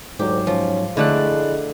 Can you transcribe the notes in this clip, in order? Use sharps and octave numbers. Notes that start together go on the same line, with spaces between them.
D2 G#2 F#3 G4
F3 C#4
D3 G#3 A3 E4 D5 F#6